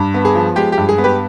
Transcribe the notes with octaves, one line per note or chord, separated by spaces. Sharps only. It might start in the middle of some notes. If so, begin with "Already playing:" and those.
Already playing: G2
B3
G#4
F3
G#3 G4
G4
G2
G#4
B3
G4 B4